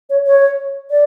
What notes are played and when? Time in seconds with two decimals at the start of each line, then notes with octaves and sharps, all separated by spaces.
0.10 C#5
0.26 C#5
0.91 D5